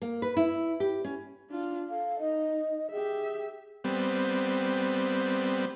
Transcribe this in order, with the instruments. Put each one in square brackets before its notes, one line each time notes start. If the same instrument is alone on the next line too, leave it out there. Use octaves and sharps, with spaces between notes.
[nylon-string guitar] A#3
B4
E4
G4
C#4
[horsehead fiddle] D4 F4
[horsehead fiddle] A4 [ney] F5
[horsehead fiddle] D#4 [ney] D#5
[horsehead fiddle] G4 E5 [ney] G#4
[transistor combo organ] G3 B3 C4